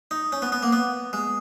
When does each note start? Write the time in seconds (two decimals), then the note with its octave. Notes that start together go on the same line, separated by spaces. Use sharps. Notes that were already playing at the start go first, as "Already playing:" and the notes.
0.11 D#4
0.32 C#4
0.42 B3
0.52 B3
0.63 A#3
0.72 B3
1.13 G#3